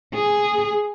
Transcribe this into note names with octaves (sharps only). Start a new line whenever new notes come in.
G#4